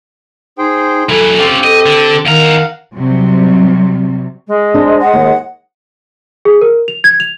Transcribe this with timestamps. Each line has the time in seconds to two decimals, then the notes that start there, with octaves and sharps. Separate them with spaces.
0.58 D#4 G#4 C5 G5
1.09 E3 F#3 A4 B5
1.39 C4 C#4 F4 G4
1.64 A4 D#5
1.86 D3
2.26 E2 D#3 F5 F#5 A#5
2.95 C3 F#3 G3
4.47 G#3
4.74 D4 C5
5.01 F#5
5.14 D#2
6.45 G#4
6.61 A#4
6.88 F7
7.04 G#6
7.20 F7